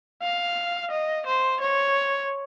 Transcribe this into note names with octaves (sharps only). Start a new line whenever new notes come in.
F5
D#5
C5
C#5